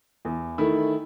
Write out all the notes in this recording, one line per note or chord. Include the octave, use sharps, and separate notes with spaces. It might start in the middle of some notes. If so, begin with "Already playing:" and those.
E2
D#3 A3 E4